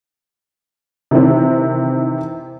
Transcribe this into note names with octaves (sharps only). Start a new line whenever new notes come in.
C3 D#3 E3 C4